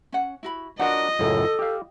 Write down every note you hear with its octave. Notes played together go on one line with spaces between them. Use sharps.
C#4 F#5
E4 F#4 B5
D4 F4 F#4 A#4 B4 D#5 F#5
C#2 F#2 A2 A4
G4 F5